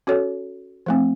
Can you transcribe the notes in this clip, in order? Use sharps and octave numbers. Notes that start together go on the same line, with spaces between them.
C#4 F#4 A4 C#5
F3 A3 C4